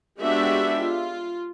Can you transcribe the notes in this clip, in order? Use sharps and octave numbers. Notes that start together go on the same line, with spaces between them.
G#3 B3 D4 F#4 G4 E5
F4